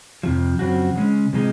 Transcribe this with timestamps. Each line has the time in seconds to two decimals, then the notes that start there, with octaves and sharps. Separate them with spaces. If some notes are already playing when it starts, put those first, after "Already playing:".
0.23 F2 C3 F3
0.59 F#2 C#3 F3 C4 F#4
0.95 C#3 G#3 C#4
1.33 C3 F3 G#3 D#4